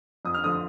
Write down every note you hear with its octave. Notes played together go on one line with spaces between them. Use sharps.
F2 D#6
F6
D3 F3 D#6